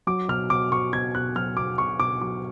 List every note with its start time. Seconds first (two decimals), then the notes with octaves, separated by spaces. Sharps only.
0.07 F#3 D6
0.28 B2 F6
0.50 B2 D6
0.71 B2 C#6
0.93 B2 G#6
1.15 B2 F#6
1.36 F#3 F6
1.57 B2 D6
1.78 B2 C#6
1.99 B2 D6
2.21 F#3 D6